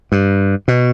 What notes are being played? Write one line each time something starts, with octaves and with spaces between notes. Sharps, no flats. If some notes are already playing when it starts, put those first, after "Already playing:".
G2
B2